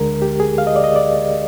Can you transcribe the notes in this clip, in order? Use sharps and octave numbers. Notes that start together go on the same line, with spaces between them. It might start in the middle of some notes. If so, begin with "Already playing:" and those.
Already playing: D2 D3 G#3 A#4
G4
G#4
F5
D#5
D5
D#5
D5